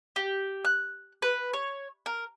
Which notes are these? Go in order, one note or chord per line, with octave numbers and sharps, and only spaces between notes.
G4
F#6
B4
C#5
A#4